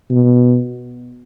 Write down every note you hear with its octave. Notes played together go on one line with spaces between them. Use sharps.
B2